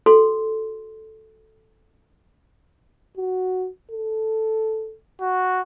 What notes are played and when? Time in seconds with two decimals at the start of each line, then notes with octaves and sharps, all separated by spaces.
0.06 F#4 A4 C6
3.17 F#4
3.91 A4
5.21 F#4